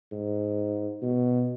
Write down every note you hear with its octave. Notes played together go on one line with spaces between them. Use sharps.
G#2
B2